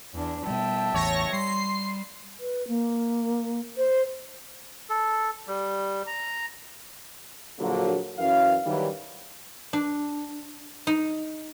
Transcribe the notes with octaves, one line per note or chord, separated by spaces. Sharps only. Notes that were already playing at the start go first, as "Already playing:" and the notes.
E2 D4
B2 G3 E5 G5 A5
A1 E2 C#5 C#6 A#6
G3 C6 C7
B4
A#3
C5
A4
G3
A#5
A#1 D3 F#3 A#3
F#2 E3 F5
D#3 E3 F#3 G3
D4
D#4